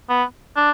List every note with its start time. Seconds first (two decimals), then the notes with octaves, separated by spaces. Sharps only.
0.09 B3
0.57 D4